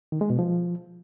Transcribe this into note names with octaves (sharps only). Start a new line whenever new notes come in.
D#3
G#3
B2
F3